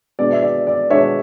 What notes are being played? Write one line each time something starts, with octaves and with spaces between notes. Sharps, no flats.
B2 G#3 B3 D4 D5
E5
D5
D5
B2 G#3 B3 D4 C#5 E5